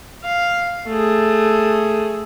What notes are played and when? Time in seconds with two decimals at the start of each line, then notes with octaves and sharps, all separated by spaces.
0.24 F5
0.87 A3 G#4